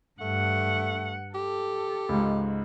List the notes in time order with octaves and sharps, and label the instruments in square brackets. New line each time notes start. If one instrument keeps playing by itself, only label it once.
[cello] G2 F#5 [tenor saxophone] A3
[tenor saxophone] G4 [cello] A4
[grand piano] C#2 G#2